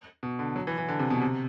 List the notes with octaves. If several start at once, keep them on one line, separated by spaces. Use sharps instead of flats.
B2
D3
F#3
E3
E3
D3
C3
B2
C3